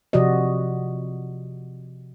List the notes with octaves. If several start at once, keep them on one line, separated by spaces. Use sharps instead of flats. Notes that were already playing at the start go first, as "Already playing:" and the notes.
C3 F3 F#4 D5 D#5